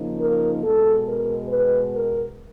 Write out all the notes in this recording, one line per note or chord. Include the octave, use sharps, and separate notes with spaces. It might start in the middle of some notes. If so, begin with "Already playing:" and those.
Already playing: C#3 F3 A#3 D#4
A#4
B2 G#3 B3 A4
A#4
B4
A#4